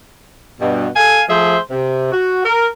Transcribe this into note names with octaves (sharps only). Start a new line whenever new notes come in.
G2 B2
A4 F5 G#5
F3 A3 G#4 C5 E5
C3
F#4
A#4